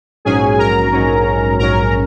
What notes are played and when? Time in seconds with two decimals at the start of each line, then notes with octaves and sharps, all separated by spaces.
0.25 A#1 G#2 F#3 C#4 G#4 G#5
0.58 A#4 A#5
0.92 A#1 G#2 F#3 C#4
1.58 A#1 G#2 F#3 C#4 A#4 A#5